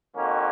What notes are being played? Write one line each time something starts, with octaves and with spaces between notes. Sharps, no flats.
F2 D#3 A#3 C#4 F#4